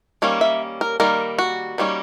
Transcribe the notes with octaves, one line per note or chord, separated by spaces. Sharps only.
D#3 G3 A#3 C#4
E5
A#4
D#3 G3 A#3 A#4
F#4
D#3 G3 A#3 C#4